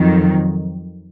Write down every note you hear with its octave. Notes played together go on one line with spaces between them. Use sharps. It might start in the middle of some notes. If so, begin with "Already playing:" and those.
Already playing: F2 D#3 F#3